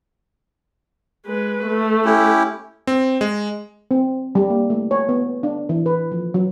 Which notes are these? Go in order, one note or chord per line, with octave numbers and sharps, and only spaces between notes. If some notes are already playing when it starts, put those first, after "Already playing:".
G#3 B4
A3
C#4 E4 G4
C4
G#3
C4
G3
A#3
A3
C#5
B3
D4
E3
B4
F3
F#3